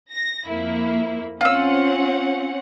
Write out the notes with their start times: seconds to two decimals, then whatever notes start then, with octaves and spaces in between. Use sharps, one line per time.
0.13 A#6
0.49 F2 A#3 E4
1.41 C4 C#4 F4 F#5 E6